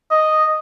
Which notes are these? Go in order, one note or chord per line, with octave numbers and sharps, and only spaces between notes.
D#5